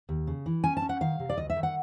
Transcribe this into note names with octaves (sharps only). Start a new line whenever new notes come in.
D#2
C#3
E3
C#4 G#5
A5
C#4
F#5
D#3 F5
C3
D5
D2 D#5
E5
D#3
F#5